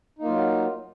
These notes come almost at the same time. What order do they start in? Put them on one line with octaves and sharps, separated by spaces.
D#4 A#3 F4 F#3